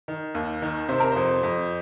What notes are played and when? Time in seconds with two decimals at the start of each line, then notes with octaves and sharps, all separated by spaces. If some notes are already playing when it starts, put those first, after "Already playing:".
0.08 D#3
0.35 D#2
0.62 D#3
0.89 C3 C5
1.00 A#4
1.12 F2 C5
1.43 F2